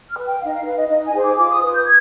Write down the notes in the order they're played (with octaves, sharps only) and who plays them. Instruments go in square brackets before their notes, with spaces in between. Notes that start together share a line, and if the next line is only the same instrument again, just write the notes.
[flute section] F6
B4
G5
D#4 F5
D#5
F5
B4 F5
D#5
D#4 D#5
G#5
G#4 C5
D6
F4 D6
D#6
B4
G6
G#6